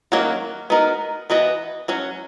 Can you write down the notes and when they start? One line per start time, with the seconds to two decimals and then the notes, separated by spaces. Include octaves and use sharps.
0.12 D#3 F#3 A#3 C#4 F#4
0.70 B3 D#4 F#4 A#4
1.30 E3 B3 F#4 B4 D#5
1.88 F#3 C#4 F#4